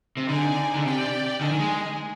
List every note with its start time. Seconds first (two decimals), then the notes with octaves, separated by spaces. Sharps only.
0.17 C3
0.27 D3 D#4 G#4 D5 G#5
0.75 D3
0.84 C3 G4 D5 G5
1.41 D3 G#4 D#5 G#5
1.50 D#3
1.59 G#3